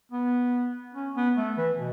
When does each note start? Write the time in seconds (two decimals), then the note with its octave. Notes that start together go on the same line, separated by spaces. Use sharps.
0.12 B3
0.94 C#4
1.16 B3
1.37 A3
1.57 E3
1.78 B2